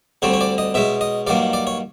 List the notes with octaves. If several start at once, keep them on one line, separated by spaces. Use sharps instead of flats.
D2 D3 G3 C4 C#5
C#5
D5
D#5
B2 G#3 C#4 E5
D#5
G2 D#3 F#3 A#3 D5
D5
C#5